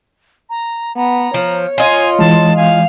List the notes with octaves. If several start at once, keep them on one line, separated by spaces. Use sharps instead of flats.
A#5
B3 A#5
F3 C#5
F4 D#5 G#5
E3 G#3 A5
F5 G#5